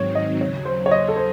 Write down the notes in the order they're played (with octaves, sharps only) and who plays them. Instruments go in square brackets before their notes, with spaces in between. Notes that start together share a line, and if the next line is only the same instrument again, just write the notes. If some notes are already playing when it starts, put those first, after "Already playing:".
Already playing: [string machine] G#2 D#3 F#3 C4 [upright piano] C#5
[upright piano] D#5
[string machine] D#2 C#3 F#3 [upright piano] C#5
[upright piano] C5
C#5
D#5
A4
C5